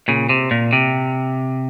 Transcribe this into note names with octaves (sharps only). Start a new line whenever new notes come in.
A#2 C#3
C3
A#2
C3